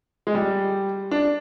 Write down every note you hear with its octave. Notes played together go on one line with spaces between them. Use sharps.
G#3
G3
D4